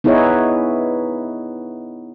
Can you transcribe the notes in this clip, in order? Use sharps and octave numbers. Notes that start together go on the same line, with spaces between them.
B3 D#4 E4 G#4 B4 C#5